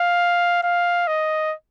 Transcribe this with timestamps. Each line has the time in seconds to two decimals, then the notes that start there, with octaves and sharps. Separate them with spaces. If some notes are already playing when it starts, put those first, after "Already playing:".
Already playing: F5
0.63 F5
1.07 D#5